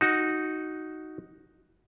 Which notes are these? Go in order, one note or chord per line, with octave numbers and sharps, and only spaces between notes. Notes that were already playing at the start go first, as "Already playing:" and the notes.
D#4 F#4